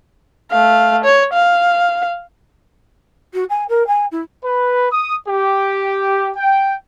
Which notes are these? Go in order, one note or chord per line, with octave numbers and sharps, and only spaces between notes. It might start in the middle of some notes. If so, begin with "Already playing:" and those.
A3 F5
C#5
F5
F#4
G#5
A#4
G#5
E4
B4
D#6
G4
G5